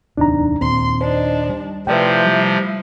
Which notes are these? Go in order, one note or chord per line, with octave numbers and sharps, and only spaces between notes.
D1 E2 C3 D4 D#4 A#5
D#2 A#2 C4 C6
D4 D#4 C5
G3
C3 F3 A3 E4 F4 B4 D5 G5
G3